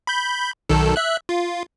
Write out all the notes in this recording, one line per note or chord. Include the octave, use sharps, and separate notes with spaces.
B5 G6
B1 D#3 A4
E5 F#6
F4